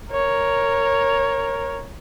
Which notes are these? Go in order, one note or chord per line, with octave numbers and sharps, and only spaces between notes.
A#4 C#5